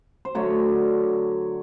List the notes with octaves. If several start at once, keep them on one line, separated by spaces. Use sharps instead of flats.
C5
D3 F#3 A3 C#5